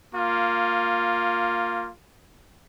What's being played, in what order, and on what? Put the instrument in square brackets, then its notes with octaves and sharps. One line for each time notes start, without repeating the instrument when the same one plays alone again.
[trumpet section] A#3 F4